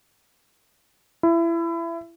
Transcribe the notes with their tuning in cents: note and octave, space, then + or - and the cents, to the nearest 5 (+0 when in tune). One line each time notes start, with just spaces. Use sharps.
E4 +25